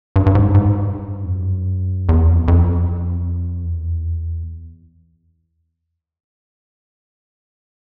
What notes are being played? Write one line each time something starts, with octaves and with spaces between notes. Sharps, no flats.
G2
G2
G#2
G#2
G2
F2
F#2
E2
F2
F2
E2